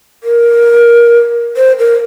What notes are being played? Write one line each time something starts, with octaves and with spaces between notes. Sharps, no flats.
A#4
C5
A#4